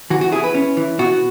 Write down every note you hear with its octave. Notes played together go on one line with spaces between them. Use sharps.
E3 F#4
F#4
E4 G#4
B4
C#4
E3
B2 F#4